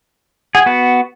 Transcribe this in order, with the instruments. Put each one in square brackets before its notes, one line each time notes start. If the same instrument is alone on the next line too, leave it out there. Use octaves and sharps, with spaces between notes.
[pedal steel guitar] G#4 [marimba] F#5 G#6
[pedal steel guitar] B3 F#4